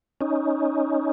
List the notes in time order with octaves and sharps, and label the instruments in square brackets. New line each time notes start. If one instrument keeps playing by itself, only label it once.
[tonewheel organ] C#4 D#4